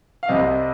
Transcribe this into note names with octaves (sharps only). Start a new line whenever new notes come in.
F5
C2 C3 G3 C4 D#5